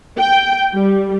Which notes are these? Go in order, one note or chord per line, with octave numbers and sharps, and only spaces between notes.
G5
G3